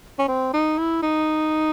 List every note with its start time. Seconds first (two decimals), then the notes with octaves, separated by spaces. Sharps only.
0.19 C#4
0.28 C4
0.53 D#4
0.78 E4
1.02 D#4